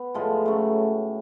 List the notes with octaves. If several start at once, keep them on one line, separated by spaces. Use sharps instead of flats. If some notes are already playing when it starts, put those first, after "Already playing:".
Already playing: B3
A2 F3 G#3
C#3 F#3 A3